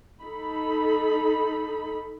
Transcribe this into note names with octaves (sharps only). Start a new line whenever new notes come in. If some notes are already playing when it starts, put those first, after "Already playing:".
D#4 A4 B5